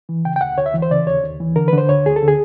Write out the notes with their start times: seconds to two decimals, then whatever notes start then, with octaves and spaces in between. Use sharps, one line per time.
0.09 E3
0.25 C#3 G5
0.36 G5
0.41 D2 F#5
0.58 D2 C#5
0.66 E5
0.74 E3
0.82 C5
0.90 C#3 D5
1.07 D#2 C#5
1.23 D#2
1.40 E3
1.56 D3 A#4
1.68 D3 B4
1.78 C5
1.89 D2 C#5
2.06 D2 G#4
2.16 A4
2.23 D3
2.28 G#4